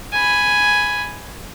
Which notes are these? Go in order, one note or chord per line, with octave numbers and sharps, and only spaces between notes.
G#5 B5